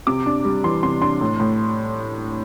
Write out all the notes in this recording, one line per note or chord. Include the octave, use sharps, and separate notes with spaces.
C3 D6
D4
G3
E3 C6
C3 C6
D4 C6
A2
A2